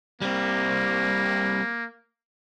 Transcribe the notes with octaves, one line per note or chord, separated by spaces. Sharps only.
G3 A#3 C4